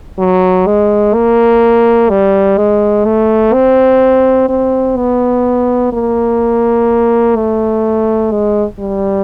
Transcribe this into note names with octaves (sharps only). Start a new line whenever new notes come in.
F#3
G#3
A#3
G3
G#3
A3
C4
C4
B3
A#3
A3
G#3
G3